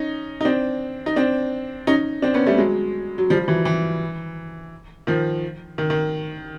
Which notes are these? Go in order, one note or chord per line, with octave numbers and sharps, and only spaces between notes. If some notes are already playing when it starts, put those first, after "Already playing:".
Already playing: C#4 D#4
D#4
C4 D4
D#4
C4 D4
C#4 D#4
C4 D4
B3 C#4
G3 A3
F#3 G#3
F#3
F3 G3
E3 F#3
E3
D#3 F3
D#3
D#3